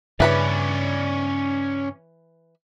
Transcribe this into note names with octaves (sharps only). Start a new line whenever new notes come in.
G2 C#3 E3 C#4 B4 D5 B5